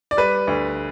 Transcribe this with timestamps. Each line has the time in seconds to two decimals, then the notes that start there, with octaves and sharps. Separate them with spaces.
0.11 D5
0.17 G3 B4
0.47 D2